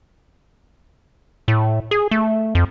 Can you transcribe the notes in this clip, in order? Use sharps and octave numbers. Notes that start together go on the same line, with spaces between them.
A2
G#4
A3
F2